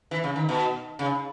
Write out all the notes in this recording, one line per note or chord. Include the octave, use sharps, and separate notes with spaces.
E3
C#3
D#3
B2
C#3